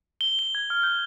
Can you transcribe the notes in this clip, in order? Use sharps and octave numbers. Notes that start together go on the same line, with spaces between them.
G7
G7
G#6
F6
G6